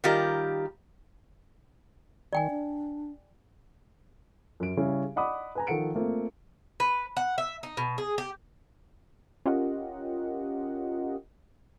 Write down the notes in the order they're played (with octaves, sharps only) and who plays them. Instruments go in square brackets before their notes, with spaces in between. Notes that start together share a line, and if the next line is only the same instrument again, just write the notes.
[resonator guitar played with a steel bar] D#3 G3 F4 G4 A#4
[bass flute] D#3 [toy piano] D5 G5 G#5
[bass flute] D4
[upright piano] F#2 D7
C#3 G3 C#4 E4
D5 D#5 F#5 B5 D6 D#6
B4 G#5 A#5
D#3 F3 A4 F#5 C#7 D7
A3 A#3 C4 F4
[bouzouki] B4
F#5
E5
D#4
B2
G#4
G4
[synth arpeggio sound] C#4 F4 G4 A#4 D#5 F#5